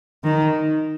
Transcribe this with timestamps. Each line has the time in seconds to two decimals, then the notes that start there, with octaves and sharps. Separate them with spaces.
0.24 D#3